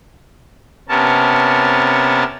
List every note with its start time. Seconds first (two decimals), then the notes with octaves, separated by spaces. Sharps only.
0.89 C3 B3 C#4 A#4 A5